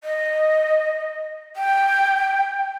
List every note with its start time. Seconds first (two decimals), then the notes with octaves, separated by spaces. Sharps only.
0.04 D#5
1.56 G5